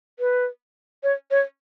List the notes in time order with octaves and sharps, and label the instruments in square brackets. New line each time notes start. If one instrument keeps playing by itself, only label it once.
[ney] B4
C#5
C#5